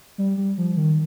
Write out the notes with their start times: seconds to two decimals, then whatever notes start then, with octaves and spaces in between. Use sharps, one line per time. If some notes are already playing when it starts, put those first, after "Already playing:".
0.18 G3
0.37 G3
0.58 F3
0.76 D#3